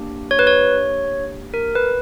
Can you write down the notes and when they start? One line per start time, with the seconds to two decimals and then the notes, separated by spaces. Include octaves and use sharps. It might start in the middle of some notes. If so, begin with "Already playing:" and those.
Already playing: A#3 D4 G4
0.31 C#5
0.39 B4
0.47 C#5
1.54 A#4
1.75 B4